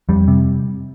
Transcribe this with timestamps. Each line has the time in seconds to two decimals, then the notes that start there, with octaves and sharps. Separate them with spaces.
0.09 F2 G3
0.28 C3